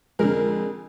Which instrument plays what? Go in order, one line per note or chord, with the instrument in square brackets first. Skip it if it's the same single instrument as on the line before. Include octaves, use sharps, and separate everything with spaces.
[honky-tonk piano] F2 D3 [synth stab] G#3 A#4 [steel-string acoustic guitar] G#4